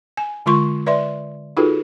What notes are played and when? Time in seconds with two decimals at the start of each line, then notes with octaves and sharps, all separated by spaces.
0.17 G#5
0.46 D3 G#3 F4 C6 C#6
0.86 B4 D5 E5 C6
1.57 D#4 F4 F#4 G#4 A4 B4